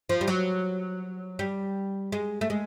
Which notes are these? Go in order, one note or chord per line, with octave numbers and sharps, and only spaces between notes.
F3
G3
F#3
G3
G#3
A3
G#3